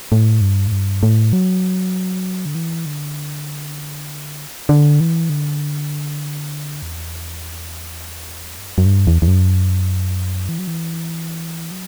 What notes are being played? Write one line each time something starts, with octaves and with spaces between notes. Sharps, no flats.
A2
G2
A2
G2
A2
F#3
D3
E3
D3
D3
E3
D3
E2
G2
F#2
F#2
G2
E2
E2
F#2
E3
F#3
E3
F#3